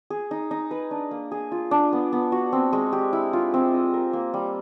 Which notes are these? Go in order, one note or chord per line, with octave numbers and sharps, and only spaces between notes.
G#4
D#4
D#4
B4
D4
A#3
G#4
F4
D4
B3
B3
F#4
C4
G#3
G4
E4
F4
C4
D#5
A#4
A#3
G3